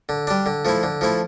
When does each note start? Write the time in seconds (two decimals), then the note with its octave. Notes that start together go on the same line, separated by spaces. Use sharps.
0.09 D3
0.27 G3 D4
0.46 D3
0.65 F3 A3 E4
0.83 D3
1.01 F3 A3 E4